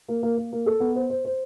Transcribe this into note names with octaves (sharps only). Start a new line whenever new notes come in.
A#3
A#3
A#3
A#3
A4
B3
C5
C5
C5